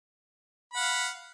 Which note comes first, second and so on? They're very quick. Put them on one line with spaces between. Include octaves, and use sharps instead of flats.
B5 F#5 F5